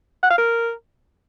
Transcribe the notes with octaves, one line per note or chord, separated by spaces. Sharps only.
F#5
F5
A#4